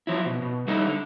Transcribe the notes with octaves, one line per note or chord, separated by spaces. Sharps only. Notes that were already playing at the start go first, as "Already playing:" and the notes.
F3 F#3 E4
B2
B2
G3 D#4 E4 A4
D3